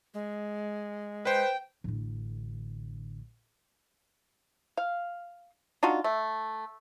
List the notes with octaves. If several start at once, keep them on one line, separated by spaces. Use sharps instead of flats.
G#3
B4 C5 G5
A1 D3
F5
D4 D#4 F4 F#4
A3